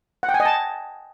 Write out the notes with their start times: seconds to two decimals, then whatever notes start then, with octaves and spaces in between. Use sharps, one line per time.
0.23 F#5
0.29 G5
0.34 G#5
0.40 D#5
0.45 A5